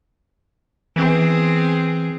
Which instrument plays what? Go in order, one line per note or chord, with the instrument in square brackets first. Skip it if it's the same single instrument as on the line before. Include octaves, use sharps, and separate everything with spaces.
[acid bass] E3 [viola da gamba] B3 C4 G#4